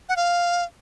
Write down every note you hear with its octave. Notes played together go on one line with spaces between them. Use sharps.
F#5
F5